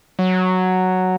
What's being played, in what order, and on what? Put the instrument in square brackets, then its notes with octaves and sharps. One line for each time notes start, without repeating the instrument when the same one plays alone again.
[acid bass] F#3